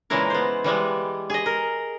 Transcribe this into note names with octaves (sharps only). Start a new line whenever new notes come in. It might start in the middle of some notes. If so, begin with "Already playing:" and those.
A#2 C#3 E3 G#3 E4 A#4
B3 C5
E3 G3 G#3 B3
G#4 D#5
A#4